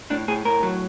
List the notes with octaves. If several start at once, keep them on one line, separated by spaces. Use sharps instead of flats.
A2 D4
A2 G#4
A2 A#4
F#3